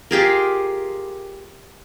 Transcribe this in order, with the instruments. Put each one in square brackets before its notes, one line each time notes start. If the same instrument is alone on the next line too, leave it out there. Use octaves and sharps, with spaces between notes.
[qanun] F4 G4 G#4 A#4